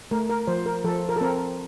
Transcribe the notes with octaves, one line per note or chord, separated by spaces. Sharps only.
A3 A#4
A#4
F3 C5
A#4
F3 A4
A#4
A4
C4 A#4